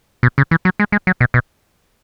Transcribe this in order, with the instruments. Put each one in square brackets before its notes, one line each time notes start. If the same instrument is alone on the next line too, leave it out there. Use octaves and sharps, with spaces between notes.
[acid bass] B2
C#3
E3
F#3
G#3
G#3
F#3
B2
B2